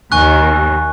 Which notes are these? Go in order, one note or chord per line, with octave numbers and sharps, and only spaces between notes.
D#2 G#5 C#6 F#6